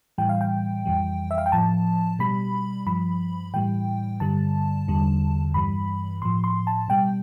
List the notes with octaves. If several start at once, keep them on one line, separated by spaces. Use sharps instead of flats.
A2 E3 G3 G5
F5
G5
F2 E3 G3
E5
F5
G5
A2 F3 A5
B2 G3 B5
G2 F3 B5
A2 E3 G3 G5
G2 D3 G3 A5
E2 D3 G3
G2 E3 G3 B5
A2 F3 C6
C6
A5
B2 G3 G5